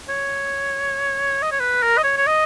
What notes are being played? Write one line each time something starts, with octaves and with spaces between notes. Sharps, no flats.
C#5
D#5
C#5
B4
A#4
D#5
C#5
C#5
D#5